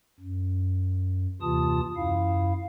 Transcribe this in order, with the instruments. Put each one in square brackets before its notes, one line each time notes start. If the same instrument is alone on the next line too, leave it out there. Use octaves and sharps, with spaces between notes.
[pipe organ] F#2
D#2 C3 E3 F4 A5 D#6
F#2 E4 F5